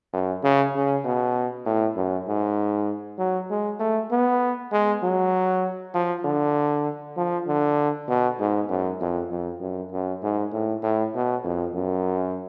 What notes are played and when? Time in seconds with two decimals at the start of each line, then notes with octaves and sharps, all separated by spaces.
0.13 F#2
0.43 C#3
0.75 C#3
1.05 B2
1.65 A2
1.96 F#2
2.28 G#2
3.18 F#3
3.50 G#3
3.80 A3
4.11 B3
4.72 G#3
5.03 F#3
5.94 F3
6.24 D3
7.17 F3
7.47 D3
8.08 B2
8.39 G#2
8.69 F#2
9.00 F2
9.31 F2
9.60 F#2
9.92 F#2
10.23 G#2
10.53 A2
10.83 A2
11.14 B2
11.44 F2
11.75 F#2